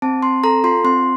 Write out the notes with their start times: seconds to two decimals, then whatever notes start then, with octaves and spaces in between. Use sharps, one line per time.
0.02 C4 A5
0.23 C4 C6
0.44 A4 A#5
0.64 F4 C6
0.85 C4 C6